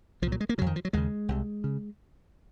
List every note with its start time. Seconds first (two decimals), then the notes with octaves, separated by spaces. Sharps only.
0.22 C2 F3
0.27 A#2 F#3
0.40 G#3
0.49 A#3
0.58 F2 C#3 F#3
0.67 D#3
0.76 F3
0.85 F#3
0.93 D#2 C#3 G#3
1.29 C2 C3
1.64 C#3